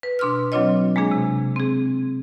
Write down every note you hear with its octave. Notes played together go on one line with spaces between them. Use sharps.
B4
B2 D4 C6 E6 F6
F#3 C4 D4 F4 C#5 D#5
G#3 A#3 D4 G#4
C3
C4 G#4